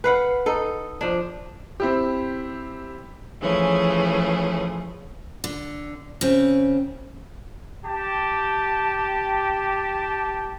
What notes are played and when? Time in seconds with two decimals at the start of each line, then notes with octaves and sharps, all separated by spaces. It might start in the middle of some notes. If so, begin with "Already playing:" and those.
0.04 B4 F5 F#5
0.46 D#4 A4
1.01 F3 D4
1.80 C4 E4 G4
3.41 E3 F3 A3 C#4 G#4
5.44 D3
6.21 C#3 C4
7.84 G4 A5